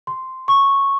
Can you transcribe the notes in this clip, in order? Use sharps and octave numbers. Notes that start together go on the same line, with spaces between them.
C6
C#6